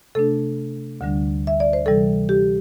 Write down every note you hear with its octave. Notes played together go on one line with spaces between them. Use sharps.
C3 A3 D4 A4
D2 D3 G3 D4
E5
D5
C5
C3 E3 G3 A4
G4